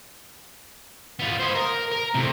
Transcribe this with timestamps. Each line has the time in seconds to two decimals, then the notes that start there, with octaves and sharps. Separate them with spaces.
1.19 B3 F4
1.40 C5 D#5
1.55 A#4
1.92 A#4
2.14 A2 C3